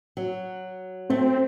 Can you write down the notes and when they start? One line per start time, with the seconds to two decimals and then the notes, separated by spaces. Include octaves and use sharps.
0.17 F#3
1.10 A3 C4